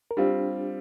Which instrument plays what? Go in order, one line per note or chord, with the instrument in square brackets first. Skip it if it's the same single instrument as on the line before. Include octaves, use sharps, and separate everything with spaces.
[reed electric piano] A#4
[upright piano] G3 C4 F4 [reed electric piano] D4 G4